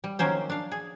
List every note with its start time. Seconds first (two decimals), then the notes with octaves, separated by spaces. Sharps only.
0.04 G3
0.19 D#3 F3 F#3 A#3 C#4 C5
0.50 D4 F5
0.71 G#4